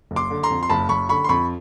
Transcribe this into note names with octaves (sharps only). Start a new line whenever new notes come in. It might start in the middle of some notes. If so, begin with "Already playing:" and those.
F#1
C6 D6
D3
A#5 C6
F2
C6
F#1 A5 B5
F#1 B5 C#6
D3 B5 C#6
C6
F2 B5 C#6